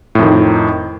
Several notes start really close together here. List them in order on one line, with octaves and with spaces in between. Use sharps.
A2 F2 D#3